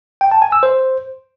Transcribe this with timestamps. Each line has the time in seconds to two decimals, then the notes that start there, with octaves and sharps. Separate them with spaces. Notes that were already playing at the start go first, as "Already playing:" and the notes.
0.21 G5
0.31 A5
0.42 G#5
0.52 E6
0.63 C5